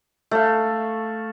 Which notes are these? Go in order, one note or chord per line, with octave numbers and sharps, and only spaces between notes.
A3 F5